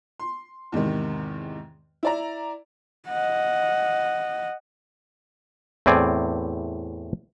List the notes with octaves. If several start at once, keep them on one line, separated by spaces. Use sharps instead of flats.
C6
E2 G#2 C3 D#3
E4 D5 A#5
D#5 F#5
E2 A2 C4 D5 G#5